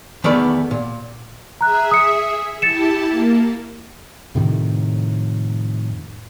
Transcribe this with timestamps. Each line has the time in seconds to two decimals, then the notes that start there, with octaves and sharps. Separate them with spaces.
0.24 E2 D#3 A3 B3 D5 B5
0.71 A#2
1.61 G#4 E5 A#5 F#6
1.91 D#6 C#7
2.62 E4 G4 A5 A6 C#7 E7
3.11 A#3
4.35 F2 A2 C3 D#3